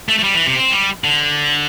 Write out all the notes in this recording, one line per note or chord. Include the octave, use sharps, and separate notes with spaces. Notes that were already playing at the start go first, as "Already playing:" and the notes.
A3
A3
G3
E3
C3
C4
G3
D3